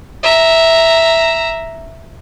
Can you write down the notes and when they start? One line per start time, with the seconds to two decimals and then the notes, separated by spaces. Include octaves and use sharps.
0.23 E5 A#5